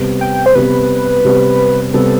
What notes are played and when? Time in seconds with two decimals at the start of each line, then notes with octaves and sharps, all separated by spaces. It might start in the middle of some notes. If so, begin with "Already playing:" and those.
Already playing: C3 G3 B3
0.21 G5
0.46 C5
0.55 C3 G3 B3 B4
1.25 C3 G3 B3
1.94 C3 G3 B3 A4